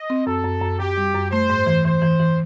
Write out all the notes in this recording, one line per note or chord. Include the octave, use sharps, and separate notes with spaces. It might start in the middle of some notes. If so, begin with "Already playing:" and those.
Already playing: D#5
C4
F#2 A4
F#2
F#2
F#2 G4
G3
F#2
A3 C5
G#2
E3
E3 C5
E3
E3